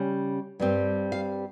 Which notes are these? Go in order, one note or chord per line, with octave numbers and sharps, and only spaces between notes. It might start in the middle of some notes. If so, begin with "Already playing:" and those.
Already playing: C#3 G3 C#4
G2 G3 C4
F5